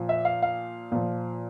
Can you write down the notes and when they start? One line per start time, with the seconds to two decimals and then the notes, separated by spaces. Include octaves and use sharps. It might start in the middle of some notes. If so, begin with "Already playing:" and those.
Already playing: A#2 F3
0.09 E5
0.25 F5
0.43 F5
0.92 A#2 F3